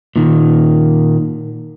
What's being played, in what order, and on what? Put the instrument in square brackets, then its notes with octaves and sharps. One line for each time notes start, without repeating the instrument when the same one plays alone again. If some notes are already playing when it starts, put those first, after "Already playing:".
[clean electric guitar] A#2 D#3